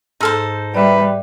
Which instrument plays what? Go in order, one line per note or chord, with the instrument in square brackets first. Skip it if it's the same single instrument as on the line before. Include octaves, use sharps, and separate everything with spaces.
[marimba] G#2 E6 F6 [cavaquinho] D#4 A4 C5
[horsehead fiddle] G3 [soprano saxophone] B4 [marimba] D5 E5